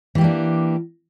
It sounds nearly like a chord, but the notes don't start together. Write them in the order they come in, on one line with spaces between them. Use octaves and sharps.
E3 G4 A#3 D4